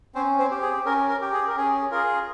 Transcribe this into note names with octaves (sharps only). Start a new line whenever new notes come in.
C4 C#4 C5
C4 C5
G4
G#4
C#4 A#4
A#4
G4
G#4
A#4
C#4 G#4
F4 G#4 A#4